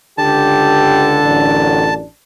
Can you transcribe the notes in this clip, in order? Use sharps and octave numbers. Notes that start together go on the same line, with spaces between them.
C#2 D3 G4 A5
A1 F#2 D4